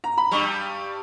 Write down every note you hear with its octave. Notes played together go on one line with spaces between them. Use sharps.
A#5
B5
G2 G3 C#6